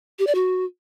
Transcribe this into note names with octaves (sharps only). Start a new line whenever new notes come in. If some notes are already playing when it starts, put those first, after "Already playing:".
G4
D5
F#4